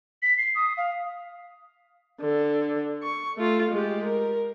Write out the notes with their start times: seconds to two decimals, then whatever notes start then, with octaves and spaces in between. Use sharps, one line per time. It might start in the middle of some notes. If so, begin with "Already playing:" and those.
0.22 B6
0.38 C7
0.55 D#6
0.77 F5
2.21 D3
3.03 C#6
3.37 A3 F4
3.71 G#3 G4
4.05 A#4